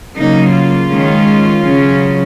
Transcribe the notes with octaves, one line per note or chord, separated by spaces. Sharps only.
C#3 F#3 A#3 D#4
F4
D#3 G#3 C#4
C#3 F#3 C#4